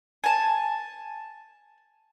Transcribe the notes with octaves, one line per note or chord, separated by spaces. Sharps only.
G#5 A5